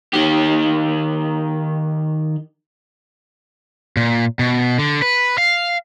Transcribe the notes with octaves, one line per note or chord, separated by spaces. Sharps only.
D#3 G4
A#2
B2
D3
B4
F5